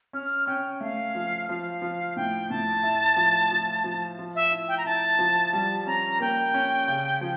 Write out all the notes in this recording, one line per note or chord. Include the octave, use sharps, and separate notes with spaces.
C#4 F6
C#4 G5
A3 F5
F3
F3 F5
F3
A2 G5
A2 A5
E4
F3
F3
F3
F3
E5
E4
G5
A#5
E4 A5
F3
G3 A5
A5
C#4 A#5
A#3 G5
C#4
C#3
F3